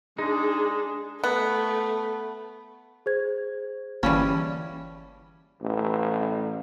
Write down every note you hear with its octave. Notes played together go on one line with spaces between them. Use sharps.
G#3 D4 D#4 G#4
A3 B3
G#4 C5 G#6
G1 E3 G3 A#3 C#4 A5
A1